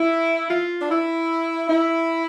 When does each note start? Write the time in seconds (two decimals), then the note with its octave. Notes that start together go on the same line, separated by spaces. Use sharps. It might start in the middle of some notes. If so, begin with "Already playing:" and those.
Already playing: E4
0.50 F4
0.81 D4
0.90 E4
1.69 E4